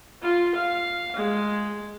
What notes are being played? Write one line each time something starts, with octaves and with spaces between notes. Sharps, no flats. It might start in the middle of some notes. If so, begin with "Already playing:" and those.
F4
F5
G#3